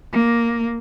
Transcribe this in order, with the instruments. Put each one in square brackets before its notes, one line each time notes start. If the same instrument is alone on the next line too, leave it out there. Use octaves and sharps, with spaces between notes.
[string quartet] A#3